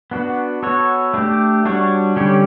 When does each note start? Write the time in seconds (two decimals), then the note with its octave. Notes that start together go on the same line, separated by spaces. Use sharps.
0.11 B3 D4 F#4
0.63 B3 F#4 A4 C#5
1.14 A3 D4 G4
1.65 G3 D4 F#4 C#5
2.16 D3 G3 C#4 G4 C#5